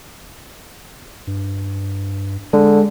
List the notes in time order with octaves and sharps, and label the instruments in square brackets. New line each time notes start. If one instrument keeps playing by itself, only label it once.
[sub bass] G2
[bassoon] D3 [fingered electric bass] G#3